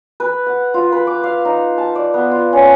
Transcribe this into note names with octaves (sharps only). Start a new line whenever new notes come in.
B4
F#5
F4
B4
D6
F5
D#4
A5
D5
B3
F4
C#4